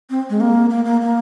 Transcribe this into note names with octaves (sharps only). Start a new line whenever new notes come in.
C4
G#3
A#3
A#3
A#3
A#3